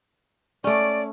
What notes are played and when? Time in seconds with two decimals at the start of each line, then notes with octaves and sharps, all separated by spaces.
0.64 A3 C#4 D5